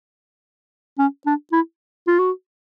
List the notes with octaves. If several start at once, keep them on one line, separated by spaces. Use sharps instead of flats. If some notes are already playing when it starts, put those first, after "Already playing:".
C#4
D4
E4
F4
F#4